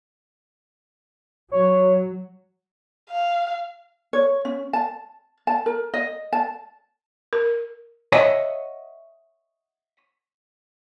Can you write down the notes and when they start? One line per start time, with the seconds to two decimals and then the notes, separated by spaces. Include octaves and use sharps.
1.52 F#3 C#5
3.10 F5
4.13 C#5
4.45 C#4
4.73 A5
5.47 A5
5.66 A#4
5.94 D#5
6.33 A5
7.33 A#4
8.12 C#5 D#5 E5 F#5